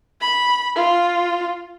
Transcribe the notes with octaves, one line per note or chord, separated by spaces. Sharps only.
B5
F4